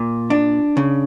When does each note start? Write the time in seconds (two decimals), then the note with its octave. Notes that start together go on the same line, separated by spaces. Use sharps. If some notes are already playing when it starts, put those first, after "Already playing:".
Already playing: A#2
0.30 D4
0.77 C#3